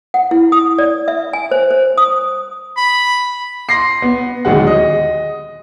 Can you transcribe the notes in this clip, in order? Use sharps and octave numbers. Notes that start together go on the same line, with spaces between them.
F#5
E4
D#6
D5
E5
G#5
C5
C5
D#6
B5
C6 A#6 C7
B3
D1 D#2 G#3 F#5
D#5